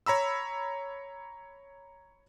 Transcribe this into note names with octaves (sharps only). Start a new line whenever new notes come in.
C#5 A#5 B5 E6